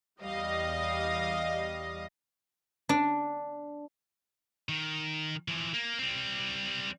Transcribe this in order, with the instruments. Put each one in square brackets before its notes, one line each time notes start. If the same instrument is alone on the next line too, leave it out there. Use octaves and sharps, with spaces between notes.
[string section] E2 G3 D#5 F5 D#6 A#6
[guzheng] D4
[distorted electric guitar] D#3
E3 F3
A#3
G3 C4